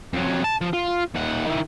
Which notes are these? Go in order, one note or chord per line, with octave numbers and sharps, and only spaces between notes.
F2 F#3
A5
F3
F4
D#2 F#5
D#3 E4